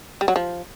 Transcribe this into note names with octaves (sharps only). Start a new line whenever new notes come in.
G3
F#3
F3